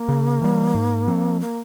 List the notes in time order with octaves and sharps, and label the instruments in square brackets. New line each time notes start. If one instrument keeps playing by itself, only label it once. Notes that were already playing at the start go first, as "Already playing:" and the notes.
Already playing: [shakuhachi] A#3
[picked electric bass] C#3
E3 G3
G#2
F3 C4
[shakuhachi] A#3